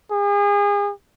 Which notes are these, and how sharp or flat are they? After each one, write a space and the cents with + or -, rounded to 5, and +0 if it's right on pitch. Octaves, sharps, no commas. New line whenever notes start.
G#4 -35